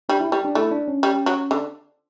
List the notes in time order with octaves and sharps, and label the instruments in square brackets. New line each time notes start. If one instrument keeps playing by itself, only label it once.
[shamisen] G3 [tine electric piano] D4
[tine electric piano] E4
[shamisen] G3
[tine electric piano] D4
[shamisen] A3 [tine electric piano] E4
[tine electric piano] D4
C#4
[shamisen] G3
F#3
D3